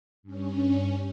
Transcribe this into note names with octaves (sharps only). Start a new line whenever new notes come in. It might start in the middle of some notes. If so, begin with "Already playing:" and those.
G2 C#4